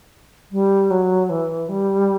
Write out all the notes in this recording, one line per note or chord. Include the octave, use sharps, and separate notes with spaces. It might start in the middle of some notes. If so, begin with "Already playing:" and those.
G3
F#3
E3
G3